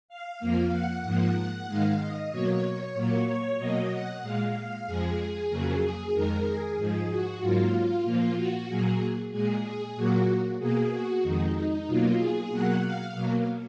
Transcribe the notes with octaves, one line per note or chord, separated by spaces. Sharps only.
F5
F2 F3 A#3
F#5
G#2 F3 A#3
G#2 D#3 G#3 F5
D#5
B2 F#3 A#3 C#5
A#2 F#3 A#3
C#5
B2 F#3 A#3 D#5
F#5
A#2 G#3 F5
F5
F2 F3 G#3 G#4
F2 C#3 F#3 A#3
G#4
F2 D#3 G#3 A#4
G#4
G#2 F3 G#3
F#4
G#2 F#3 A#3 F4
A#2 F3 A#3
F#4
A#2 F#3 A#3 G#4
A#2 G#3 G#4
G#4
A#2 F#3 A#3 F#4
B2 A#3 G#4
F#4
F2 D#3 G#3 D#4
D#4
B2 F#3 A#3 F4
G#4
B2 F#3 A#3 F#5
F5
B2 F#3 A#3